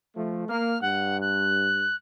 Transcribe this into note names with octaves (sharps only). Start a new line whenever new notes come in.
F3 A3
A#3 F6
G2 F#5
F#6